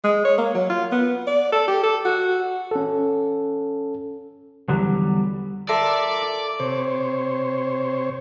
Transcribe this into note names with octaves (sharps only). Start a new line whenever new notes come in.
G#3
C#5
A#3
F#3
F4
B3
D5
A4
G4
A4
F#4
C#4 A4
E2 D3 F#3 G3
F4 A4 A#4 D5 E5 D6
C3 C5 C#5